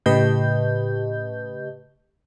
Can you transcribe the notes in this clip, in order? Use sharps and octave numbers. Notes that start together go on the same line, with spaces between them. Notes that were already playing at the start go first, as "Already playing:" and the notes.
A2 C#3 G4 B4 D#5 G6